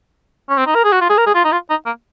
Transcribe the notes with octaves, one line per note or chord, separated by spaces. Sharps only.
C#4
C4
D#4
A#4
G#4
F#4
F4
G#4
A#4
G#4
F4
D#4
F4
D#4
A#3